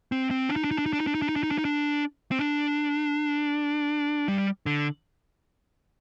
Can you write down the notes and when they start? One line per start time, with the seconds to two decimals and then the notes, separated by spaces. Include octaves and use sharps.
0.12 C4
0.31 C4
0.49 D4
0.56 D#4
0.64 D4
0.71 D#4
0.79 D4
0.86 D#4
0.93 D4
1.00 D#4
1.07 D4
1.15 D#4
1.22 D4
1.29 D#4
1.36 D4
1.43 D#4
1.51 D4
1.58 D#4
1.65 D4
2.31 C4
2.39 D4
4.28 G3
4.66 D3